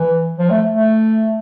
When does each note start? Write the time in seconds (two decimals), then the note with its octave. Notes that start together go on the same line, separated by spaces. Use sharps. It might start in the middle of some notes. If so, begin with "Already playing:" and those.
Already playing: E3
0.38 F3
0.50 A3
0.74 A3